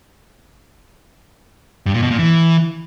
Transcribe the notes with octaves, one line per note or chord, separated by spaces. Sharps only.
G2
A#2
B2
A#2
E3